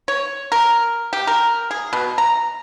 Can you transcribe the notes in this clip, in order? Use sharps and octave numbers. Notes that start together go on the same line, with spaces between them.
C#5
A#4
G4
A#4
G#4
B2
A#5